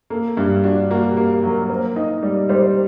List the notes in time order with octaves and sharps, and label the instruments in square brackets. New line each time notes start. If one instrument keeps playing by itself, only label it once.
[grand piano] A#3 [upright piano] A4
[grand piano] G2 [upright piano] G4
[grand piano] D4 [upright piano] F#4
[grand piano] A#3 [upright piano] F#4
[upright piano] G4
[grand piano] A#3
F#3
[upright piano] A#4
[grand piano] A#3 [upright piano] C5
[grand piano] D#4 [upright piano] D#5
[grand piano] G3 [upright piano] D5
[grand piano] G3 [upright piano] C5